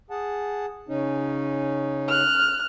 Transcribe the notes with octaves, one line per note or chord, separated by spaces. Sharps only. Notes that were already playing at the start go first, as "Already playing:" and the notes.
G#4 F#5 A5
C#3 C#4 D#4
F6 F#6